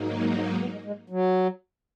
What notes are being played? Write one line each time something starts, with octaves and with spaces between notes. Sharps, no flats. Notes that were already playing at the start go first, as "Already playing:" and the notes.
Already playing: G#2 F#3 A#3 D#4
D#3
D#3
G#3
B3
G#3
G#3
F#3